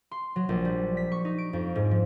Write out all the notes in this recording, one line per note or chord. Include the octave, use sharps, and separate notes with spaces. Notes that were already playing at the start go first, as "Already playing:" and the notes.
C6
F#3
A#1
G3
B6
C#6
D#4
D7
F2
G#2
F3